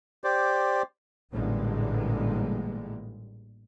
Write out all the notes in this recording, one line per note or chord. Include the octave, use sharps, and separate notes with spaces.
G4 C5 D5
A1 A#2 D3 G3 G#3